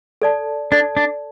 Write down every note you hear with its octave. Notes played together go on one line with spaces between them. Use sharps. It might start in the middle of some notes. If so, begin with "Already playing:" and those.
A4 D5 A5
D4 A4 D5 A5
D4